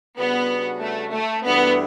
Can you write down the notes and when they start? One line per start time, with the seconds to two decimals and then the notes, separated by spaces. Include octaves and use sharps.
0.19 C#3 G3 B3 D4 F#4
0.81 A3
1.13 A3
1.44 G2 E3 A3 B3 D4 F#4